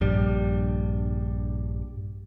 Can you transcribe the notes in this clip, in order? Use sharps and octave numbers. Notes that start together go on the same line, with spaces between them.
A#1 G2 G3